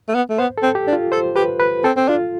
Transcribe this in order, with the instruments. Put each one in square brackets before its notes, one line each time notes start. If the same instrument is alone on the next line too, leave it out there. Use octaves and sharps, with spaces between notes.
[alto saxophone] A3
B3
A3
[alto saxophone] B3 [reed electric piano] C5
[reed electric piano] A4
[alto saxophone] C4
[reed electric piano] G4
[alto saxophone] D4
[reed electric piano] F4
[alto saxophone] A4 [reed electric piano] C5
[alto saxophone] G4 [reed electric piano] B4
[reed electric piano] B4
[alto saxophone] C4 [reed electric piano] A4
[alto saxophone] C4
[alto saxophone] D4 [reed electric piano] F4